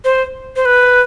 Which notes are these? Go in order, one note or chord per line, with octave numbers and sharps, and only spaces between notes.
C5
C5
B4